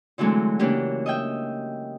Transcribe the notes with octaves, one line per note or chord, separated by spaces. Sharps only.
D3 E3 F#3 G#3 A3 C4
C#3 E3 A#3 D4 G4
D#5 E5 G5